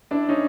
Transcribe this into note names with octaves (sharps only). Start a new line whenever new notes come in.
D4 E4
C#4 D#4